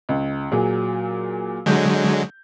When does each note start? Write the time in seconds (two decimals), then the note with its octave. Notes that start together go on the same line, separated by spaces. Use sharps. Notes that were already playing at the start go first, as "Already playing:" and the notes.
0.09 C#2
0.51 A#2 F#3 G#4
1.66 D3 F#3 G#3 G6